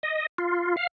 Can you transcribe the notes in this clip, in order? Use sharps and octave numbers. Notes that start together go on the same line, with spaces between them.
D#5
F4
F5